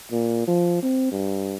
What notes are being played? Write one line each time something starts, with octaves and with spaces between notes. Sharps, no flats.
A#2
F3
C4
G2